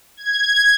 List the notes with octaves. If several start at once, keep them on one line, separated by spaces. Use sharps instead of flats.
G#6